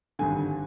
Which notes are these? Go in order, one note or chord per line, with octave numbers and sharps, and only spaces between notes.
G#1 G2 D3 G#5